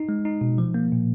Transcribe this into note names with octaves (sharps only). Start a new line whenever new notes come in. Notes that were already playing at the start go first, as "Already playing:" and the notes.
Already playing: D#4
G#3
D#4
B2
F3
A#3
A#2